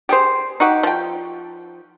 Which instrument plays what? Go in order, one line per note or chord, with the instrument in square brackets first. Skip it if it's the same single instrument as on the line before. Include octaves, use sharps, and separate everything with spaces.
[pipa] G4 G#4 C5
D#4 F#4 G4
F3 G5